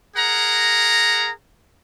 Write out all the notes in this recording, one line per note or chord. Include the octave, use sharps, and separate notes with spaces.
G#4 A#4 F#5 A#5